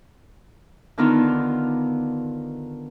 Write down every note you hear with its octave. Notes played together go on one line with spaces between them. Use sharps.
D3 D#3 B3 D4 D#4 F4